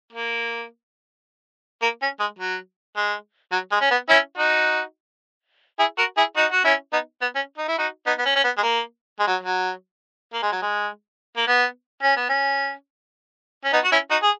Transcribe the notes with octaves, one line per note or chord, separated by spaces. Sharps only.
A#3
A#3
C#4
G#3
F#3
G#3
F#3
G#3
C#4
B3
C#4 E4
D#4 F#4
E4 G#4
F#4 A#4
E4 G#4
D#4 F#4
F#4
C#4 E4
B3 D#4
B3
C#4
D#4
E4
D#4 F#4
B3 D#4
B3
C#4
C#4
B3
G#3
A#3
G#3
F#3
F#3
A#3
G#3
F#3
G#3
A#3
B3
C#4
B3
C#4
C#4
B3 D#4
F#4
C#4 E4
D#4 F#4
G#4